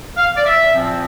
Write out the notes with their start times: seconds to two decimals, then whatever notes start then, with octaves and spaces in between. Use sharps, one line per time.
0.16 F5
0.36 D5
0.46 E5
0.74 A#2 F3 C4